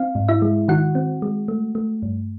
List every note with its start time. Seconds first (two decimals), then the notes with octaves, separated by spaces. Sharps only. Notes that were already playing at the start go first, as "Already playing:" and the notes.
Already playing: C4 F5
0.15 G#2
0.28 E4 E5
0.42 G#3
0.68 D#3 F#4 F#5
0.95 C4
1.22 G#3
1.48 A3
1.75 A3
2.02 G2